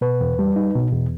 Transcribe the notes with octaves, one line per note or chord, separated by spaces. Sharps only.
B2 B4
E2
G3
D#4
B2
E2